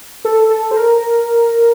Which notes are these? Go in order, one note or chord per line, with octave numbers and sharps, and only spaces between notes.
A4
A4
C5
A#4